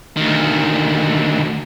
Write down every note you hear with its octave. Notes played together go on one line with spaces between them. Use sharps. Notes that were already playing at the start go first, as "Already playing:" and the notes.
D2 D#3